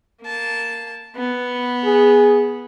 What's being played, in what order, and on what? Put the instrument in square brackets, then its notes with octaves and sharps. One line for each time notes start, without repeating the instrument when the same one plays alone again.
[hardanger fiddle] A#3 A5
B3
[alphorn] G#4